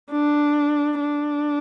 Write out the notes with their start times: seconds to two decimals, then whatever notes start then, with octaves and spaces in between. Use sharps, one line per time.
0.12 D4
1.00 D4